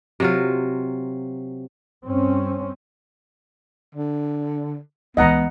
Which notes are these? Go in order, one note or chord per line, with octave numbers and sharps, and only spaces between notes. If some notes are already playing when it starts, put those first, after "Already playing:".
C3 F#3 F4
G2 C4 C#4
D3
C#2 E3 B3 D#5 F#5 A#5